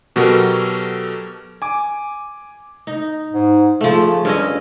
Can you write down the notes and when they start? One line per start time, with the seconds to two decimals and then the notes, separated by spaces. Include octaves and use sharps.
0.16 B2 F#3 F#4 G4 A4 A#4
1.62 G#5 D6
2.87 D#4
3.33 G#2
3.81 C#3 F3 A3
4.25 G2 C#4 D#5